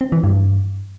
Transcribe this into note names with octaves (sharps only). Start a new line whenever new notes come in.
C4
E3
G2